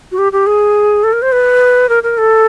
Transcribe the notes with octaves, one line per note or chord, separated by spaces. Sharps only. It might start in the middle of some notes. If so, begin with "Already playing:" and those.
F#4
G4
G4
G#4
A4
A#4
C5
B4
A#4
A#4
A4